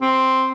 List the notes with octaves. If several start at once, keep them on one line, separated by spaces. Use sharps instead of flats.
C4